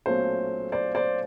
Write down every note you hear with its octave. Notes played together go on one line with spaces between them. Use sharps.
B1 A#2 F#3 A3 C#4 C5
C5 D5
C5 D5